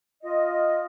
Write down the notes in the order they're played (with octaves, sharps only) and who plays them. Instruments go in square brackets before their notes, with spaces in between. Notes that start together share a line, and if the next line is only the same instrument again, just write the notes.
[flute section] F4 D#5